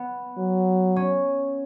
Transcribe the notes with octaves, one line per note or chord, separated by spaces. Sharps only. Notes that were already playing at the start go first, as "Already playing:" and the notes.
Already playing: B3
F#3
C#4